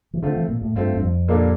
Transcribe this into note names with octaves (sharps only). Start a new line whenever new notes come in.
E3
D3 A3 C4 F4
E3
A#2
A2
G2 A3 C4 F4
G2
F2
A#2 G3 A#3 D4 A4